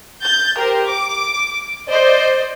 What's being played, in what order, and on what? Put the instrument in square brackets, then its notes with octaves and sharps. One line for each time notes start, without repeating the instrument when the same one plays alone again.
[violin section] G6 A6
G4 A#4 C5
D6
C5 D5 D#5